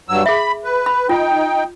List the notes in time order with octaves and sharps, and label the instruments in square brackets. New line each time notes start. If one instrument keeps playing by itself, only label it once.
[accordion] G2 F#3 E6
[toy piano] G#4 E5 [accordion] B5
[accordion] B4
[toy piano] B5
[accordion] D#4 G5 [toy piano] F4